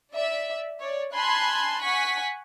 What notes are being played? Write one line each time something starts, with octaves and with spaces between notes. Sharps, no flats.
D5 E5
C#5 D5
G#5 A5 B5 C6 F#6 G#6
F#5 G#5 C#6 B6